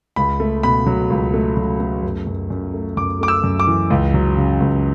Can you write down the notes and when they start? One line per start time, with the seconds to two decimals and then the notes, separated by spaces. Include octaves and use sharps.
0.16 C#2 B5
0.40 A3
0.63 B2 B5
0.86 F#3
1.10 C#2
1.34 A3
1.57 F#3
1.80 A3
2.03 F#2
2.27 F#2
2.50 F#2
2.74 A3
2.97 F#2 D6
3.21 A3 D6
3.28 E6
3.44 F#2
3.60 D6
3.67 E3
3.90 C#2
4.14 F#3
4.37 C#3
4.60 C#2